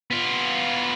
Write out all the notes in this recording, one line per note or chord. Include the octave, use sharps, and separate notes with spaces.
B3 F4